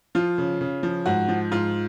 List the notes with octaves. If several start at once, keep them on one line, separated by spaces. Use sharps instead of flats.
F3 F4
C#3
C#3
F3
G#2 F#4
F3
G#2 F4